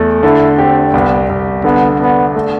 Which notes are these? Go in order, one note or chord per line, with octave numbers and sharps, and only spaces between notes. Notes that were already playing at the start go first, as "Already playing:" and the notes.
Already playing: E2 A3
D3 E4
C4 G4
C2 B3
C2
D3 B3
B3 D4
A3